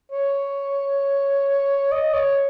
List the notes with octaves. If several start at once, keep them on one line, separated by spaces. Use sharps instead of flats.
C#5
D#5
C#5